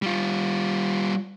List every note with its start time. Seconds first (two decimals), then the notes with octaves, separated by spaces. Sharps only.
0.02 G3 F4